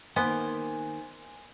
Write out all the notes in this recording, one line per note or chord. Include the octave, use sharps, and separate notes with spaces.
D#3 A#3 B3 C5 G#5